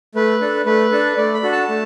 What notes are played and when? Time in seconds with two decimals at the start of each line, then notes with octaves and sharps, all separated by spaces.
0.15 A3 B4
0.41 D4 A4
0.66 A3 B4
0.92 D4 A4
1.17 A3 D5
1.34 B5
1.43 D4 F#4 A4
1.52 A5
1.69 A3